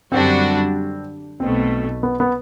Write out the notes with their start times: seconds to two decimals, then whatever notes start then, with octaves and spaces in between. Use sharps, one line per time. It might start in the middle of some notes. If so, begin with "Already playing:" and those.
0.12 F#2 D3 G3 C4 D4 F#4
1.40 B1 B2 A3 C4
2.03 B3
2.20 B3